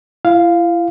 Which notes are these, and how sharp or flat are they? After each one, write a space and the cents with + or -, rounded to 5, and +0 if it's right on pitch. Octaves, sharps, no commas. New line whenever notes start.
E4 +40 F5 +0